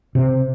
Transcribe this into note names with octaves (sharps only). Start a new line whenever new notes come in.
C3